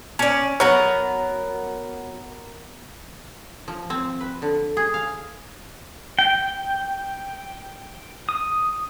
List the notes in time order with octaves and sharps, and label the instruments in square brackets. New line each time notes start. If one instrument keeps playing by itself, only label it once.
[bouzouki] C#4 D5
[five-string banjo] F#3 [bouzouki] B3 A#4
[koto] F3
C4
B4
D3
G#4
F5
[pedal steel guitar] G5
D#6